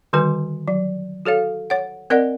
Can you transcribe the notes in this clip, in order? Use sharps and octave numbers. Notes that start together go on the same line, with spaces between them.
D3 D#3 G3 F#4 B4 G#5
F#3
F#4 A4 C#5 F5
C#5 F#5
C4 A#4 D5 D#5 F#5